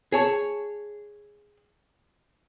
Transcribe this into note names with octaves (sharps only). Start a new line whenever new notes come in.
G#4 C#5 A5